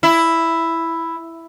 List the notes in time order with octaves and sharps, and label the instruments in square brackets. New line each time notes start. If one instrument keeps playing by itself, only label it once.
[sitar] E4